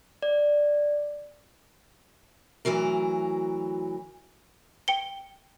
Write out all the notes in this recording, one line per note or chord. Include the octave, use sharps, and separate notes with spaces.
D5
D2 A2 E3 F#3 A#4
G5 C#7 G7